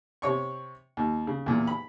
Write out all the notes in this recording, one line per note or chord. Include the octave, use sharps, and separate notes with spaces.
C3 C#5 C#6
D#2
C#3
E2 A#2
B5